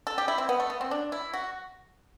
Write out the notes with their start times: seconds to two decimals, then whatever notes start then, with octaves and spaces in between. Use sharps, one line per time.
0.07 A4
0.18 G4
0.28 E4
0.38 C4
0.49 B3
0.60 A3
0.70 B3
0.81 C4
0.91 D4
1.12 E4
1.33 F#4